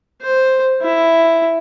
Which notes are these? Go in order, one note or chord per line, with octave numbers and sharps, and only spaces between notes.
C5
E4